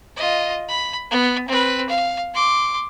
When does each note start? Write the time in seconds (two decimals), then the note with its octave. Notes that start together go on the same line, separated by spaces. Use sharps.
0.16 F4 D#5
0.69 B5
1.11 B3
1.48 C4 B4
1.89 F5
2.34 C6 D6